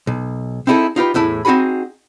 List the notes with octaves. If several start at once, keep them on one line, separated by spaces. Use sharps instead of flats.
B1
C4 D#4 E4 G#4 A4
D#4 F4 G4 B4
E2 A2 E4 A5
C4 D#4 F#4 G#4 B5